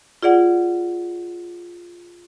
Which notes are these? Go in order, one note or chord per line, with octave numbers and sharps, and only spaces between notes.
F4 G#4 D5 F#5